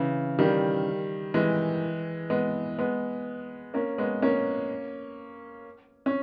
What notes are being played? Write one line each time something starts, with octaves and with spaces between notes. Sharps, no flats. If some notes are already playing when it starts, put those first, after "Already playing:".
Already playing: C#3 E3
D#3 G3
E3 G#3
G#3 B3
G#3 B3
A#3 C#4
G#3 B3
A#3 C#4
C#4